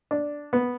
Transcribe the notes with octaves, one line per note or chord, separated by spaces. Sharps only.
D4
B3